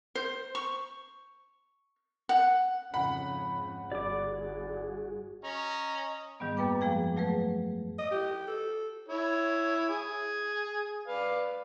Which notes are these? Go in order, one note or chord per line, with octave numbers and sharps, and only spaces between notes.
C5
C#6
F#5
F2 G#2 C#3 F#5 B5
G1 G2 F#4 G#4 D5 D6
C#4 D#5 A#5
G#2 D#3 G3 B3
F#2 A#3 B4 G5 D6
F3 G#3 G#4 G5
F#3 A3 G#4 B4
D#5
G4
A4
E4 C#5
G#4
B4 D5 F5